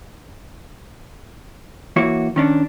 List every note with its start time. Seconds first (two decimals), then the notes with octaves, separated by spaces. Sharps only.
1.96 E3 A#3 F#4 C#5
2.36 D#3 C#4 D4